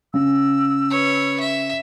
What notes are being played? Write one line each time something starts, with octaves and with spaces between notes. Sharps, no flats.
C#3 E6
B4 C#5
E5